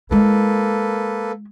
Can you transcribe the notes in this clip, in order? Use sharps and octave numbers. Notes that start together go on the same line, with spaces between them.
G#3 A#3 E4 A4 B4